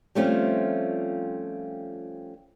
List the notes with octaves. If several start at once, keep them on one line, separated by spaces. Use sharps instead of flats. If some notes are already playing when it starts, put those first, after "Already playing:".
F3 G3 A3 C4 C#4 F4